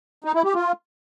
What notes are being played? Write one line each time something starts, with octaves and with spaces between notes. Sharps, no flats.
D#4
E4
G4
F4